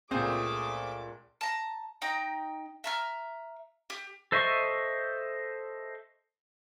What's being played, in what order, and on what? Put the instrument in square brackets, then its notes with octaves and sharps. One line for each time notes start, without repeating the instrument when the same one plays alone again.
[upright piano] C#2 A#2 [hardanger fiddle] A3 D6 [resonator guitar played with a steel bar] C4 C5 G#5 [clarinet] G#4
[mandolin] A5 A#5
D#4 G5 A#5
E5 A#5 F6
G4
[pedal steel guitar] A4 C5 D#5 E5 C#6